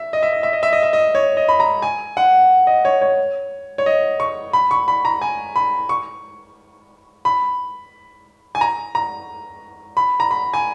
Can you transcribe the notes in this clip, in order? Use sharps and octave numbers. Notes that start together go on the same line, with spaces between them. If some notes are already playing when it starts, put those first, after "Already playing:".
Already playing: E5
D#5
E5
D#5
E5
D#5
E5
D#5
E5
D#5
C#5
D#5
B5
A#5
G#5
F#5
D#5
C#5
C#5
C#5
D#5
C#6
B5
C#6
B5
A#5
G#5
B5
C#6
B5
G#5
A#5
A#5
B5
A#5
B5
G#5